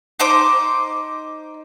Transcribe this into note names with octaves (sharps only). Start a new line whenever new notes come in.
D#4 C5 D6